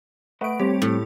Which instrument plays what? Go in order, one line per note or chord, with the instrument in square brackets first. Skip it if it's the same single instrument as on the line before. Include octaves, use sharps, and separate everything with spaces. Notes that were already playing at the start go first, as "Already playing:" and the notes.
[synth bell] A3 D7 [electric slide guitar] B4 D#5 F#5
[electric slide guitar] G3 C4 [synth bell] G4 C#5
[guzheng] A2